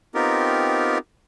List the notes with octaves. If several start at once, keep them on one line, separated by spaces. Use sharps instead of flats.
B3 C4 D#4 F4 G4 A#4